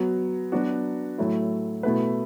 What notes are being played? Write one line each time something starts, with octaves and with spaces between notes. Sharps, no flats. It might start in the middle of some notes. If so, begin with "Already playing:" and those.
Already playing: F#3 B3 F#4
F#3 B3 D4 F#4
A2 F#3 A3 E4
B2 A3 E4 B4